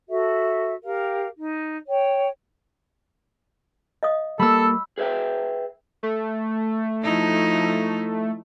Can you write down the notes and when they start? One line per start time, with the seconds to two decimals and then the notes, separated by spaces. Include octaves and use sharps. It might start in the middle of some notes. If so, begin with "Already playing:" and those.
0.09 F#4 A4 E5
0.84 G4 A#4 F5
1.37 D#4
1.88 C#5 G5
4.03 D#5 F5 D#6
4.40 G3 A#3 A4 B5 E6
4.98 G#4 B4 C#5 E5 G5
6.03 A3
7.03 F3 D#4 E4